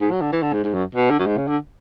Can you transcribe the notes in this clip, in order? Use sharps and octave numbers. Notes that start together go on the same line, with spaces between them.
G#2
F#3
D3
E3
D3
G#2
G#2
F#2
B2
D3
F#2
G#2
C#3
D3